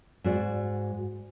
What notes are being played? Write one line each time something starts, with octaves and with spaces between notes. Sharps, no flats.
G#2 F#4 D5